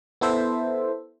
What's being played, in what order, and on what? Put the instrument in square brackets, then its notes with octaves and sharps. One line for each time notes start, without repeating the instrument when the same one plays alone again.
[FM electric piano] B3 E4 A4 C5 E5